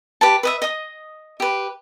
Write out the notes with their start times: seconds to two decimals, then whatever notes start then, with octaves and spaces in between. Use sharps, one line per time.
0.21 G4 B4 A5
0.43 B4 D#5 E5
0.62 D#5 D#6
1.40 G4 B4